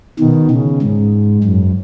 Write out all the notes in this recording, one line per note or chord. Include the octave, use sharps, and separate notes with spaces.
B2 D#3
C#3
G#2
F#2